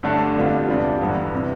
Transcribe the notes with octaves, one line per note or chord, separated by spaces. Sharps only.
G2 D3 A3 D4
F2 D3 G3 B3 F4
E2 C3 G3 D4 F4
G1 G2 E3 B3 E4
C3